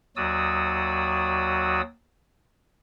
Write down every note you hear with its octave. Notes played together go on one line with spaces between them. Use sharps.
D#2 F#3 F#4 D5 D#6 E6